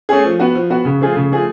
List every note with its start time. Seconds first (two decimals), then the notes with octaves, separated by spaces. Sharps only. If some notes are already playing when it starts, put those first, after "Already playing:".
0.09 A3 C#4 G#4
0.25 F3
0.40 B3 F#4
0.55 F3
0.70 B3 F#4
0.85 C#3
1.01 F3 A3 F4 G#4
1.16 C#3
1.31 F3 A3 F4 G#4